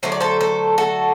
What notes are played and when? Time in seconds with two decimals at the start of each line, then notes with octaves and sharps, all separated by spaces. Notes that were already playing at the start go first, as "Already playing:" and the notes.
0.03 D3 F#3 A3 D4 C5
0.12 D5
0.20 A4 C5
0.41 A4 C5
0.78 F#4 A4